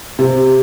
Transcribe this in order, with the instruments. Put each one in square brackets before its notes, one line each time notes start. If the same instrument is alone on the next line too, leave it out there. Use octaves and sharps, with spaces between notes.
[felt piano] C3